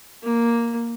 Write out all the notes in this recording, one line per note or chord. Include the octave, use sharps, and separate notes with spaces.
A#3